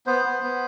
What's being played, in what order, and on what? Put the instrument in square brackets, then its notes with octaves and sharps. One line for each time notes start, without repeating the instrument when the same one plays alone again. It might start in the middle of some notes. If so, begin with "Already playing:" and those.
[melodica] B3 C5
B3
B3